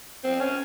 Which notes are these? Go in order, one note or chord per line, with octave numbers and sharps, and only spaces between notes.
C4
C#4